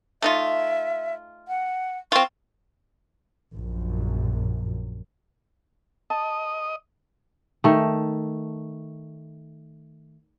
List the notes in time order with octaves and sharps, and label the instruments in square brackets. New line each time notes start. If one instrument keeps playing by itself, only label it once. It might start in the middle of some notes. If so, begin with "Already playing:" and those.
[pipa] A3 D#4 F4 [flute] E5
[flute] F#5
[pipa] C4 F4 [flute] C#6
[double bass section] A#1 F#2
[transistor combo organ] D#5 [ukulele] A5
[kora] D#3 A3